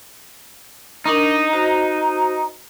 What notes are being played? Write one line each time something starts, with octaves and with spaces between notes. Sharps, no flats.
D4 D#4 A#4 C#6
F#4 C5 A#5